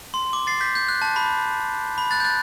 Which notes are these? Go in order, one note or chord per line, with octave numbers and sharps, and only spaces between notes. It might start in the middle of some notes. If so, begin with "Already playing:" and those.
C6
D6
A6 C7
G6 B6
G6
F#6
A5
B5
B5
F#6 A6
G6
F#6 A6